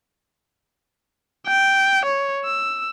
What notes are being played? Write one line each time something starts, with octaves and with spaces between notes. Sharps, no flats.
G5
C#5
E6